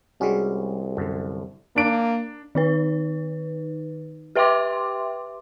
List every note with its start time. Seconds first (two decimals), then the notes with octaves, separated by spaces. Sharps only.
0.21 C2 G3 G#3 C#4 F#4 G#4
0.97 F#2 D3
1.76 A#3 D4 D7
2.55 D#3 D#4 B4
4.36 G4 B4 E5 G5 C6 D6